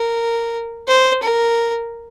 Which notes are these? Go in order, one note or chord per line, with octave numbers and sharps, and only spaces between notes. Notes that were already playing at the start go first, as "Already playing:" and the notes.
Already playing: A#4
C5
A#4